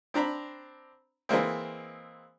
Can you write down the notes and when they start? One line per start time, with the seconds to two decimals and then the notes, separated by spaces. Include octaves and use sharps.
0.14 C4 D4 A#5 B5
1.29 E3 G#3 A#3 C4